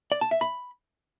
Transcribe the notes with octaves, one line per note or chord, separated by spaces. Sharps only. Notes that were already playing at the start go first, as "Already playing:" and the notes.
D5
A5
E5
B5